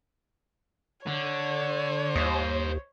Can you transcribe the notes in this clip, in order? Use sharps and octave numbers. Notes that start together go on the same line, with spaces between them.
D3 C#5
D#2 C5 D#5